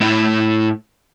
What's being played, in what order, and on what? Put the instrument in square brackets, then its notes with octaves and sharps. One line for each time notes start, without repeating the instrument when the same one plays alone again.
[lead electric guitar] A2 E4